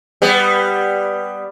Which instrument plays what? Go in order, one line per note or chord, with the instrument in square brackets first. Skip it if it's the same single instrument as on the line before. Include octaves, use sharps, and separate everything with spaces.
[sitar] G3 B3